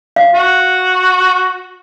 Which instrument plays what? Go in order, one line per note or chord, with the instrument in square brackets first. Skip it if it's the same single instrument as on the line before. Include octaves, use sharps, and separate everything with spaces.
[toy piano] F5
[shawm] F#4